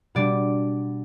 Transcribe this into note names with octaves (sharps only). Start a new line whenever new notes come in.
B2 G3 D4 D5